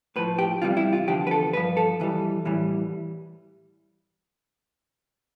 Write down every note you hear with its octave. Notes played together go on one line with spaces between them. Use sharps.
A2 F3 B4
G4
E2 C3 G3 F4
E4
F4
E2 D3 F3 G4
B4
A4
G2 F3 B4
A4
F2 E3 G3
A2 E3 G3